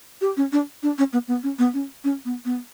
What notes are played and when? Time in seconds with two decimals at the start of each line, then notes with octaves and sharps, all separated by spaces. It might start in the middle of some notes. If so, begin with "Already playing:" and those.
0.21 G4
0.37 C#4
0.52 D4
0.83 D4
0.98 C#4
1.13 B3
1.28 B3
1.43 C#4
1.59 B3
1.74 C#4
2.04 C#4
2.25 B3
2.45 B3